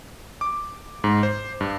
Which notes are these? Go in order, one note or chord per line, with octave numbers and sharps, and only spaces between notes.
D6
G#2
C5
G2